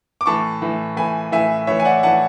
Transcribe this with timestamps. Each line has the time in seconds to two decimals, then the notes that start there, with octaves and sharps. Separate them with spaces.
0.21 D6
0.26 A2 E3 A5 C#6
0.62 A2 E3
0.97 A2 E3 G#5 B5
1.32 A2 E3 E5 G#5
1.67 A2 E3 C#5 E5
1.80 G#5
1.85 D5 F#5
2.03 A2 E3 F#5 A5